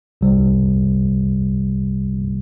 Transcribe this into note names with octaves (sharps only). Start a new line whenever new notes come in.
C2 C3 G3